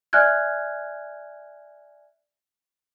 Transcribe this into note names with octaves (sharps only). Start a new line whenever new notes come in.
D5 E5 G#5 F6 F#6 G#6